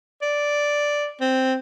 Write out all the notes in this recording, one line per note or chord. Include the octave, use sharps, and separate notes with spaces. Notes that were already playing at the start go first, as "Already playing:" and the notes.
D5
C4